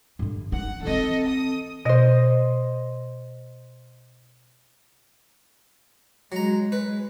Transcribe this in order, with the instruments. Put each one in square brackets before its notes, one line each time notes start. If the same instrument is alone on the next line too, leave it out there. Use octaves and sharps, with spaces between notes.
[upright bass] G2 D3
[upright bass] C#4 D#4 [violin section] F#5
[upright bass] E3 C4 [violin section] A4 D#5
[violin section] D#6
[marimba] B2 [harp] C5 D#5
[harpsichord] F#3 A#5 [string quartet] G#3
[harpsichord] B4